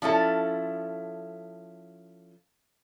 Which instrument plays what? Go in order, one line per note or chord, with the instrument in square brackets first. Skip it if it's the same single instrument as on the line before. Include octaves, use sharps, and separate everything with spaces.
[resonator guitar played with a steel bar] F3 C#4 E4 A4